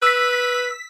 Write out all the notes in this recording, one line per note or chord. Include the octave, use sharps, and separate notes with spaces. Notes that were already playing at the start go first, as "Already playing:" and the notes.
B4 E6 B6